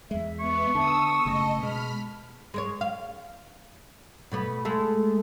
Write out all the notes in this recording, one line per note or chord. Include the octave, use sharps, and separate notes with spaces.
E2 G#3 E5
B3 C#6
D3 A5 D#6 E6
F#1 C#3 A3 D#5
B2 G#3 B5 F6
G#3 A#4 C#5
F5
B2 A3 B3
G#3 A3 A4